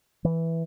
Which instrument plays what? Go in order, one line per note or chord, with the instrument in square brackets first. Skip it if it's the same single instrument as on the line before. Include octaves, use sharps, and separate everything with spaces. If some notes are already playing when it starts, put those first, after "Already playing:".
[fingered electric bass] E3